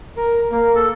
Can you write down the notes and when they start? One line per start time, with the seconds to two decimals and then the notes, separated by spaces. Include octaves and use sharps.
0.17 A#4
0.51 A#3
0.75 A4